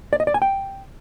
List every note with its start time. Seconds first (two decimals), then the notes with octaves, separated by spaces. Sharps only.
0.13 D5
0.20 D#5
0.27 D5
0.34 G#5
0.42 G5